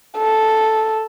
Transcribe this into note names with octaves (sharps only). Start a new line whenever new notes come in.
A4